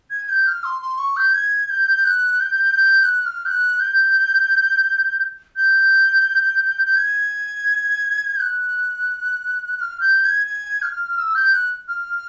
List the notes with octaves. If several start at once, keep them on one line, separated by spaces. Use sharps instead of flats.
G#6
G6
F6
C6
C6
C#6
G6
G#6
G6
F#6
G6
G6
G6
F#6
F#6
F6
G6
F#6
G6
G6
G6
G#6
G6
F#6
F#6
F6
G6
G#6
G#6
F6
E6
G6
F#6
F6